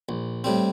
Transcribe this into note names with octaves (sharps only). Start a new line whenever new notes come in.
A#1
A2 G3 C4